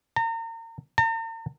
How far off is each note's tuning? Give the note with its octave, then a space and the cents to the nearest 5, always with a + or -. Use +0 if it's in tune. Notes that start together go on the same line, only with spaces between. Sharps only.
A#5 -35
A#5 -45